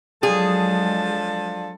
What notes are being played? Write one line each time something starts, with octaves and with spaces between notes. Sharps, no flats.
F3 F#3 G#3 D4 G#4 A4